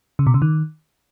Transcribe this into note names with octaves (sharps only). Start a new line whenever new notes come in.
C#3
B2
C#3
D#3